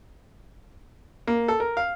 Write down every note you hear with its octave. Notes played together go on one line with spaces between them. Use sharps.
A#3
A4
A#4
F5